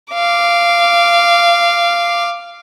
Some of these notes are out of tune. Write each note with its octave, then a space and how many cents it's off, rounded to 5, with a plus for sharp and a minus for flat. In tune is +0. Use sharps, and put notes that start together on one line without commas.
F5 -15 D6 +0